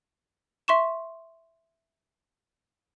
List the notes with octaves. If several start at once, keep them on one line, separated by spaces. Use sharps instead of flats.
E5 C6 C#6 E7